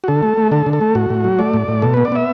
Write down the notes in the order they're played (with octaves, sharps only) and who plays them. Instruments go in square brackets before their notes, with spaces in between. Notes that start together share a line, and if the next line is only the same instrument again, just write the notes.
[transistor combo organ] F#4
D3 A4
A3
A3
D3 A4
D3
A4
A3
A2 F#4
A2
F#3
A3 D5
A2
A2
B2 A4
B3 B4
D5
B3 E5